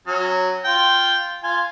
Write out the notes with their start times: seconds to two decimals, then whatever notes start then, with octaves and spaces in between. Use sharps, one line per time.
0.07 F#3 C#4
0.65 F4 G5
1.44 F4 G#5